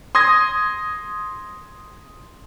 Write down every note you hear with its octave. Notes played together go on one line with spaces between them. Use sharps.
C6 D#6 G#6 A#6